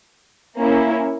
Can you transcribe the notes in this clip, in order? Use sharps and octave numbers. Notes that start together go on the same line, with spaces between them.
A#3 C#4 E4